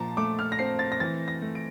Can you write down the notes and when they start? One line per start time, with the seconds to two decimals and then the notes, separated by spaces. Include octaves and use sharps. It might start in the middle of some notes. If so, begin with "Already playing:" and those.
Already playing: A#2 F3 A5 A#5
0.17 A3 D6
0.39 F6
0.52 A#6
0.59 C4 C7
0.79 A6
0.92 A#6
1.00 E3 A6
1.28 A#6
1.42 A3
1.55 D7